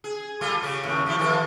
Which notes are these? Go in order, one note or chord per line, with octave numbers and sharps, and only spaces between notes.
G#4
G3 F4 A4
C#3 C#4
D#2 A2 C#3
F3 G3 E4
D#3 F3 A4